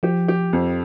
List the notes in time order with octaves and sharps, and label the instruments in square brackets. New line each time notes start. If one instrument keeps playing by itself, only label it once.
[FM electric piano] F3 [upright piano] G4
[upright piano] G4
F2